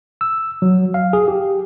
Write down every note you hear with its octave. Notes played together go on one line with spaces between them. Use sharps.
E6
F#3
F5
G#4
G4